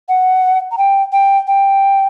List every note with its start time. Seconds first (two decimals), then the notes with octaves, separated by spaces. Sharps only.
0.09 F#5
0.71 A#5
0.78 G5
1.12 G5
1.47 G5